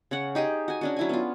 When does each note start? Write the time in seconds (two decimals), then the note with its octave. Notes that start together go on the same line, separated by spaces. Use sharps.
0.11 C#3 C#5 F#5
0.35 D#4 G4 G#4 D#5
0.68 F#4 G#5
0.81 C#4 D4 F#4
0.97 F#3 E4 G#5
1.09 B3 F4